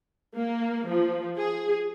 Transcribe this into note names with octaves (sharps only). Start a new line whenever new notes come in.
A#3
F3
G#4